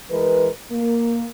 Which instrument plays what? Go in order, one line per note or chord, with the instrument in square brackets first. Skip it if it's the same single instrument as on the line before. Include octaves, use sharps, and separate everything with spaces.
[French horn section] E3 G#3 A#4 B4
A#3